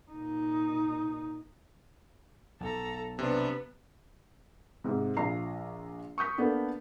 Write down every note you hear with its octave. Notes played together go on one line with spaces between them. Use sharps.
A#2 D#4
B1 A4 A#5
C3 B3 D4 B4
G#2 C3
A#1 F4 A#5 C7
C#6 D#6 G6 B6
A#3 B3 D4 A4